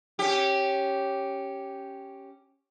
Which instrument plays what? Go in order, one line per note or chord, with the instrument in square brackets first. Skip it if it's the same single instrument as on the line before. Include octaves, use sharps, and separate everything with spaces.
[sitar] C#4 G4